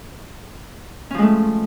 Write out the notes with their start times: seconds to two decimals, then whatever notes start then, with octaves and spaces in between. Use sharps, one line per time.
1.11 C#4
1.15 F3
1.18 G#3
1.22 A3